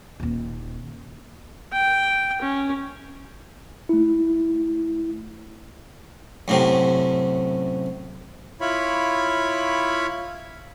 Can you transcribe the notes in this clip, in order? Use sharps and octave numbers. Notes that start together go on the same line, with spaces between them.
D#1 D#2
G5
C#4
A3 E4
F#2 A2 C3
E4 F4 C#5 B5